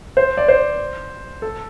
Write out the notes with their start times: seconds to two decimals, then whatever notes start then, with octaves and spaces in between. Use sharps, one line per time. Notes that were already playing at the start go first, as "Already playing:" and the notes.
0.17 C5
0.37 D5
0.48 C5
1.42 A4